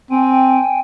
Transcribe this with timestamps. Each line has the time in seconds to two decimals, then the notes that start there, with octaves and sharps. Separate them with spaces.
0.11 C4 G5 G#5